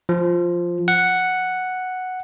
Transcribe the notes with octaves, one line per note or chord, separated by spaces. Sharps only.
F3
F#5